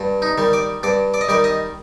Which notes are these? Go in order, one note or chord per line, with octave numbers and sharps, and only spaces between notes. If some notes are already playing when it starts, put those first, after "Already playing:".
Already playing: G2
D#4
D#3 G3
D5
G2 D5
D5
D#5
D#3 G3 D5
D#5